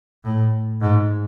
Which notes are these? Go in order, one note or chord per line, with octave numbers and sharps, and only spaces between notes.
A2
G#2